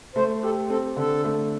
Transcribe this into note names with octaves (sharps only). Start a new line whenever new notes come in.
A3 C5
G4 A4
C4 A4
D3 A4
A3